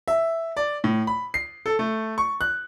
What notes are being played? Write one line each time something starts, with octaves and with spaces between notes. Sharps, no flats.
E5
D5
A2
B5
C7
A4
A3
C#6
F#6